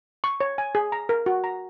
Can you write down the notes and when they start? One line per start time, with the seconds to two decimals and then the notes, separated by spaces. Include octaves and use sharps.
0.24 C#6
0.41 C#5
0.58 G#5
0.75 G#4
0.92 A#5
1.09 A#4
1.26 F#4
1.44 A#5